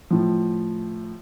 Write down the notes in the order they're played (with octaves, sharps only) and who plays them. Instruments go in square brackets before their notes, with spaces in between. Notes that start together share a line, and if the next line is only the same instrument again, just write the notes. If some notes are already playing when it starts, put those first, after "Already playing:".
[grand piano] A2 F3